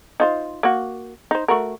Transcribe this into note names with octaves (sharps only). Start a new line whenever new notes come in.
D#4 F4 C5
A#3 F#4
D#4 C5
A3 F#4 A#4